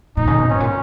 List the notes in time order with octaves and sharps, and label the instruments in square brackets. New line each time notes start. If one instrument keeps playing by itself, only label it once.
[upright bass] A#2 [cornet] D#4
[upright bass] C#3
B2
[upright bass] G#2 [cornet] C#4
[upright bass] A#2